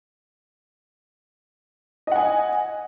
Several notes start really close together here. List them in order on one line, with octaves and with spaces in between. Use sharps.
D#5 F#5 G#5